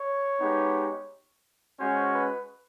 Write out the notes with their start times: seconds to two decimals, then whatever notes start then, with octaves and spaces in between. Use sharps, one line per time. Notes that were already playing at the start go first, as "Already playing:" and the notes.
Already playing: C#5
0.40 G#3 B3 D#4 G4
1.79 G#3 C#4 F#4 C5
2.13 B4